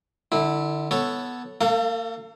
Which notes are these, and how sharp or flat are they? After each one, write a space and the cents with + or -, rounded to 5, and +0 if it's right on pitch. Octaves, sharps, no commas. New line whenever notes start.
D3 +25 E4 -15
B3 -5 A4 +0 C#5 +0
A#3 -40 A4 +30 F5 +0